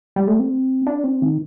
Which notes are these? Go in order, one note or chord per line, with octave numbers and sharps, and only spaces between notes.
G3
A3
C4
D4
C4
D#3